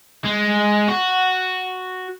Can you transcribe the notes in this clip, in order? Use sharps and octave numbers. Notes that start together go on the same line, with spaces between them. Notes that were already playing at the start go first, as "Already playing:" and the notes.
G#3
F#4